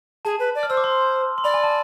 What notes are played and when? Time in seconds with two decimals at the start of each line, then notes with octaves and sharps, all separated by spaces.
0.25 G#4 A5
0.39 B4
0.55 D5
0.63 F6
0.69 C5 E6
0.77 D6
0.84 C6
1.38 C6
1.44 D5 B5
1.54 G#5
1.64 A5